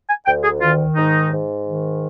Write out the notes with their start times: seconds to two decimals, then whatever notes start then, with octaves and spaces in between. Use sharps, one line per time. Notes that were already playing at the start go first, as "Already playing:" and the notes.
0.08 G#5
0.26 D2 G5
0.44 G#4
0.61 D#3 F4
0.96 G#2 D#4
1.31 G#2
1.66 D#3